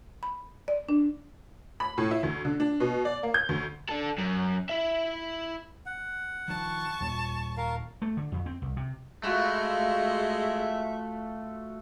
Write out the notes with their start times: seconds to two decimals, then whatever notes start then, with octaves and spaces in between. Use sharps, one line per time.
0.23 B5
0.68 D5
0.89 D4
1.80 B5
1.98 A2
2.11 E4
2.23 D2
2.45 D3
2.60 D4
2.80 B2
3.05 D5
3.23 A#3
3.34 G6
3.49 D2
3.89 D4 A4
4.18 F#2
4.69 E4 E5
5.86 F#5
6.48 D#3 F3 A5 C#6
7.00 D#2 A#2
7.57 A#4 F5
8.02 A3
8.17 D3
8.32 F2
8.46 C4
8.62 C2
8.77 C3
9.23 G#3 A3 F4 F#4 E5 B5